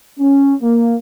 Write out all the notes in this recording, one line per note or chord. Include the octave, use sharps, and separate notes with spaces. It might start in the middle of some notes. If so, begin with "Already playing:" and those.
C#4
A#3